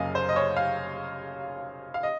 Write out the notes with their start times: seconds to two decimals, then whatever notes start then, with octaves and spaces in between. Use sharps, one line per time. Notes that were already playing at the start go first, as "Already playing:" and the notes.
Already playing: F#1 F#2 C#3 F#3 A#3 D#5 F5 G#5
0.15 C5
0.29 D#5
0.36 C#5
0.57 F5
1.94 F5
2.03 D#5